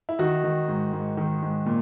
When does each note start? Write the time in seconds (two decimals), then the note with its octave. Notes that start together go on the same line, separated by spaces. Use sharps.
0.09 E4
0.19 D#3 D#4 F#4
0.44 D#3
0.68 G#2
0.93 G#2
1.17 D#3
1.42 G#2
1.66 A#2